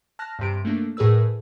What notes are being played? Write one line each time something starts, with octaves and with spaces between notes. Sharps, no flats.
A5 F6 F#6 A#6
G2 C3 D7
A3 A#3 D4
A2 G#4 A#4 B4 E6